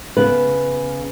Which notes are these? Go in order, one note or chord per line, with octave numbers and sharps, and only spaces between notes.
C#3 B3 B4